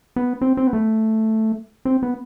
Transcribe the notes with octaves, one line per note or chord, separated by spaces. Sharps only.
B3
C4
C4
B3
A3
C4
B3